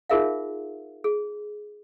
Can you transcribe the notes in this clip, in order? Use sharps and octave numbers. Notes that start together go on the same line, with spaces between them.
D#4 F4 G#4 A#4 E5 F5
G#4